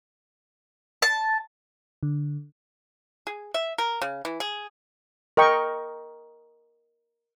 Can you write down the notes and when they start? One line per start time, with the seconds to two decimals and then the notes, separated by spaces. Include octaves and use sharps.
1.02 A5
2.03 D3
3.27 G#4
3.54 E5
3.78 A#4
4.02 C#3
4.25 E3
4.40 G#4
5.37 A#4 D#5 G5 C#6